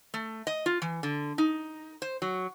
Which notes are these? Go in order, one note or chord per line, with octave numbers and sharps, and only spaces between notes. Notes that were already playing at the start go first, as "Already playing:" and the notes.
A3
D#5
F4
E3
D3
D#4
C5
F#3